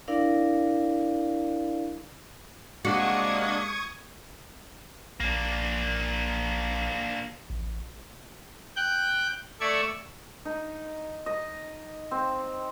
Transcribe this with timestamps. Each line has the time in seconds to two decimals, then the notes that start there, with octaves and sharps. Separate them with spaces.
0.08 D4 E4 A#4 D5 F5
2.85 C3 G#3 A#3 D4 F#4 C#6 D#6 G#6
5.20 A#1 A#3 D4
7.50 A1
8.76 G5 F#6 G6
9.61 A3 D5 E5 C#6 G#6
10.45 D#4
11.26 D#5
12.11 C4